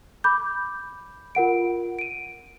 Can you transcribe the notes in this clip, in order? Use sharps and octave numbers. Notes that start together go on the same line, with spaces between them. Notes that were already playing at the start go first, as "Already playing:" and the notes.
B5 D6 G6
F4 A#4 F#5 D7
D7 D#7